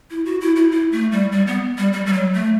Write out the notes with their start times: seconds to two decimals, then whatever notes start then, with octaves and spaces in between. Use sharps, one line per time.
0.11 E4
0.26 F#4
0.41 E4
0.56 E4
0.72 E4
0.92 A3
1.12 G3
1.32 G3
1.47 B3
1.78 G3
1.93 G3
2.06 G3
2.13 F#3
2.34 A3